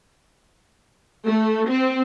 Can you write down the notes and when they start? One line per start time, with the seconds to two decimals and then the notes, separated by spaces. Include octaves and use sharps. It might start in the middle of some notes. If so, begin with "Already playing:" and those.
1.26 A3
1.67 C4